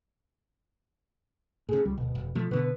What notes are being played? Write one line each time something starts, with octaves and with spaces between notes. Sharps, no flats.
A2 C#3 G#4
C#2 G3
D1 B2
F1
B2 F3 A3
B2 D3 B3 B4